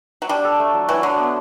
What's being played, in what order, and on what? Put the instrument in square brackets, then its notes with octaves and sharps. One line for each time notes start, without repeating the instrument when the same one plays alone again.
[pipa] F#3
[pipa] G3 [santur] D4
[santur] A4
A3
F#3
[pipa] E3 [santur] F#3
[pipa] D3 [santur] F#3
[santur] B3